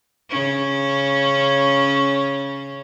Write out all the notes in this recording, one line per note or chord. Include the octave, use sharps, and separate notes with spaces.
C#3 C#4